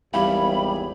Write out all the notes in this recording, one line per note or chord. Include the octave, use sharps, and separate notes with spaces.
G#1 E2 G3 E4 G4 F5 B5